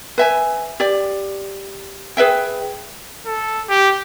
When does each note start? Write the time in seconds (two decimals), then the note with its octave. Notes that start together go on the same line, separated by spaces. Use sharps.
0.18 B4 E5 G#5
0.80 G4 D5
2.17 G#4 B4 E5 G5
3.26 A4
3.69 G4